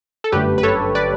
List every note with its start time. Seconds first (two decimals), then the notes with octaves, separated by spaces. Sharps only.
0.24 A4
0.32 G1 F#2 D3 A3 G4 B4
0.58 B4
0.63 A4 C#5
0.95 B4 D5